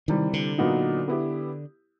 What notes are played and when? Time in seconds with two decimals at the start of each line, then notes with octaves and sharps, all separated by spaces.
0.08 C3 D#3 E3 G3
0.33 D3
0.58 A#2 F#3 B3 D#4 F#4
1.08 B3 E4 G4